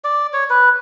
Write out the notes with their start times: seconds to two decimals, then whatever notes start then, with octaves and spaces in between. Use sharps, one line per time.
0.04 D5
0.33 C#5
0.50 B4